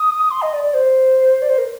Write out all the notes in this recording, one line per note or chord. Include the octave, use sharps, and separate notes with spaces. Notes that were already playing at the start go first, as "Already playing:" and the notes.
Already playing: D#6
C6
D#5
D5
D5
C5
D5
C5
A#4